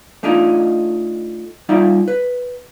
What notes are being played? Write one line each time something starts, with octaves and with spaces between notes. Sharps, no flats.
A3 D4 D#4 F4
G3 D#4 F4 D5 E5
B4